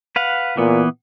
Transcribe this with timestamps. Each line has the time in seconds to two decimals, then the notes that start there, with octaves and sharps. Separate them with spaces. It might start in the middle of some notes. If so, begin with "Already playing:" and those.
0.16 B4 F5 F#5
0.57 A#2 E3 B3